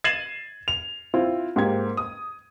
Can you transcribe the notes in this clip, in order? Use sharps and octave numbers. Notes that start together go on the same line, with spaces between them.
G#6 A6 C7 D#7 E7 F#7
F7
C4 E4 F4
G#2 A#3 G4 G#6
D#6